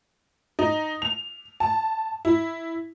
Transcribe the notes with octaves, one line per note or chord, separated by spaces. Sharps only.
D#4
F7
A5
E4